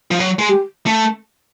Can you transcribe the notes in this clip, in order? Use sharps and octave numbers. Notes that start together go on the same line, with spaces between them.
F3
F#3
G#3
G4
A3